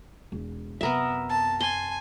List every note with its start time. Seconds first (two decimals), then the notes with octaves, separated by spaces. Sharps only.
0.32 E1
0.81 F#2 C3 B3 A#4 B4 E5
1.30 A5
1.61 G#5 A5 C6